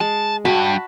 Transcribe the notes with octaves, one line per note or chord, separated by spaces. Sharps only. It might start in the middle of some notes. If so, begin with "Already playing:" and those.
G#3 A5
D2 G2 F#4 A5 B5